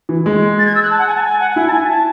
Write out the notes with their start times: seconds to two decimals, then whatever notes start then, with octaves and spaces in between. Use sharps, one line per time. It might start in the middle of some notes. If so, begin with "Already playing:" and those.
0.09 E3
0.26 G#3
0.59 A6
0.66 G#6
0.75 E6
0.82 F#6
0.91 A5
0.99 F#5
1.07 G#5
1.15 A5
1.23 G#5
1.40 F#5
1.52 F#5
1.56 E4 G#5
1.67 A5
1.73 G#5
1.84 G#5
1.89 A5